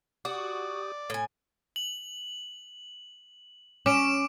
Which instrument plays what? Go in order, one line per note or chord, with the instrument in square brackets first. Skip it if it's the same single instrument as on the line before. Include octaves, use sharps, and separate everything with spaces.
[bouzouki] F#4 [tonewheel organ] G4 D#6 [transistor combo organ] D5
[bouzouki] A2 G#5
[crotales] F#7
[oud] C#4 [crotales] D6 D7 E7